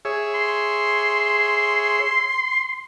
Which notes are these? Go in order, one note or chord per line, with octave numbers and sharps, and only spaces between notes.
G#4 C#5 E5
C6